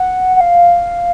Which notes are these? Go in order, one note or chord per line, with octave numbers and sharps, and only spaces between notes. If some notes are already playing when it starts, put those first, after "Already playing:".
Already playing: F#5
F#5
F5